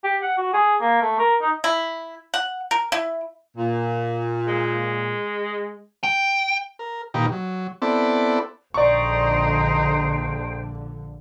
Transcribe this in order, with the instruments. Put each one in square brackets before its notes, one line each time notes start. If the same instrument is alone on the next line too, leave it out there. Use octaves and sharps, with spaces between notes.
[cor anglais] G4
F#5
F#4
G#4
A#3
A3
A#4
D#4
[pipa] E4
F#5
A#4
E4
[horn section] A#2
[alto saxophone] G#3
[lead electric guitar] G5
[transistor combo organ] A#4
A#2 D#3 D#4 G4 B4 G5
F#3
B3 C4 E4 A4 D5
[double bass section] A#1 D3 [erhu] D#4 [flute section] C5 G5 [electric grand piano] D5 C#6